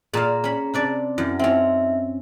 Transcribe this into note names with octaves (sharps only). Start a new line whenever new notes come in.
A#2 G#4 F5 A#5
C#4 B5
C3 D4 D5
F#2 E4
C4 C#4 D#4 E5